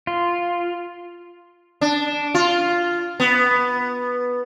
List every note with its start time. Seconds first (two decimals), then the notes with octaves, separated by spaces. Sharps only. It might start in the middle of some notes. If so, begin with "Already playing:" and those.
0.07 F4
1.81 D4
2.34 F4
3.20 B3